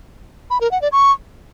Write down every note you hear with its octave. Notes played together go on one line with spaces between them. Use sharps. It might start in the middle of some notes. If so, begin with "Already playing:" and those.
B5
A#4
F#5
D5
C#6